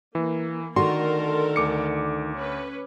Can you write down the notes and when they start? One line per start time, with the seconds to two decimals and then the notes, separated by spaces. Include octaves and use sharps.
0.15 E3 A#3
0.76 D3 D#3 A3 F#4 A4 A#4 C6
1.56 D2 D6 C#7
2.34 C#4 B4